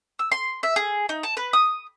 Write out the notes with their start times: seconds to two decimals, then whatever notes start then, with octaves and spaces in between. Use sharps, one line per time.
0.19 E6
0.32 C6
0.63 E5
0.76 G#4
1.09 D#4
1.23 A5
1.37 B4
1.53 D#6